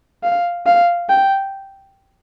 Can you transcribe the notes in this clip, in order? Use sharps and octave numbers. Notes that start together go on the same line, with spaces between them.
F5
F5
G5